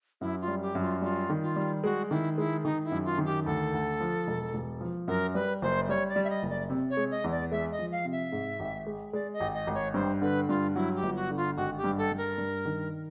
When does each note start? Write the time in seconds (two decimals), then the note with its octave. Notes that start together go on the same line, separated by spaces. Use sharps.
0.21 F#2 E4
0.41 F4
0.48 G3
0.62 G4
0.75 F#2
0.82 F4
1.02 G3 F4
1.30 D#3
1.43 F4
1.56 G3
1.84 G#3 F#4
2.11 D#3 E4
2.38 G#3 E4
2.64 D#3 D#4
2.84 E4
2.91 F#2
3.05 F4
3.18 D#3
3.25 G4
3.45 D2 A4
3.73 D2
4.00 F3
4.27 E1
4.54 E1
4.81 F3
5.08 F#2 A#4
5.35 G3 B4
5.62 F#1 C5
5.89 G3 C#5
6.09 D5
6.16 G3
6.24 E5
6.30 D#5
6.43 F#1
6.50 D5
6.70 C3
6.90 C#5
6.97 G#3
7.11 D#5
7.24 E2
7.31 D5
7.51 G#3 E5
7.72 D#5
7.79 F3
7.92 F5
8.05 C3
8.12 E5
8.32 G#2
8.60 G#1
8.86 G#3
9.13 G#3 D5
9.33 D#5
9.40 G#1
9.54 D#5
9.67 G#1
9.74 C#5
9.94 G2 C5
10.22 D3 B4
10.49 G2 F4
10.75 F#3 E4
10.96 G4
11.03 G1
11.16 F#4
11.30 D3
11.37 F4
11.56 G#1 F#4
11.77 G4
11.84 G2
11.98 A4
12.11 G2
12.17 A#4
12.38 G2
12.65 D#3